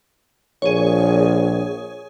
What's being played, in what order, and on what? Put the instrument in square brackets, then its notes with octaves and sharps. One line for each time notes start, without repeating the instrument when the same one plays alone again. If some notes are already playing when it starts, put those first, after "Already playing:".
[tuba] A#1 [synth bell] G#4 C#5